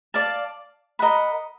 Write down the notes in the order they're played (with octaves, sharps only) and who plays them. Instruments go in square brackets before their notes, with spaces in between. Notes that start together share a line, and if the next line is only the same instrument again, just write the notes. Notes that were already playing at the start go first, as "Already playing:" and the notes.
[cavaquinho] D5 F5 A5
A#4 D#5 F#5 B5